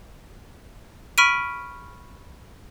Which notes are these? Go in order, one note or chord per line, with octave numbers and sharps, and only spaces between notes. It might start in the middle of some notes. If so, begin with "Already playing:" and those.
B5 C#6 F6 B6 D7 D#7